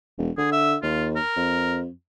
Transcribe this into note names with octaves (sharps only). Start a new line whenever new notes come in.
E1
D3 G#4
E5
D#2 F4
A#4
F2